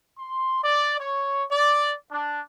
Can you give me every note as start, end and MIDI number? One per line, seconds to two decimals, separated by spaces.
0.17 0.62 84
0.64 0.97 74
1.00 1.43 73
1.51 1.93 74
2.10 2.39 62